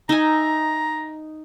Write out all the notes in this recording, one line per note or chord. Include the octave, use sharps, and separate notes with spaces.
D#4 E5 G#5 A#5